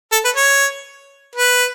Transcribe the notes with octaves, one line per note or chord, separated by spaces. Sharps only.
A4
B4
C#5
B4